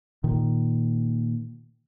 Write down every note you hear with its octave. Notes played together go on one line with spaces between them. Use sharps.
A#2 D#3